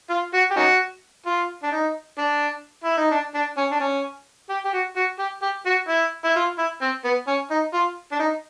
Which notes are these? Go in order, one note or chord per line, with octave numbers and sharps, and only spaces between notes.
F4
F#4
G4
C#4 D#4 F#4
F4
D4
D#4
D4
E4
D#4
D4
D4
C#4
D4
C#4
G4
G4
F#4
F#4
G4
G4
F#4
E4
E4
F4
E4
C4
B3
C#4
D#4
F4
D4
D#4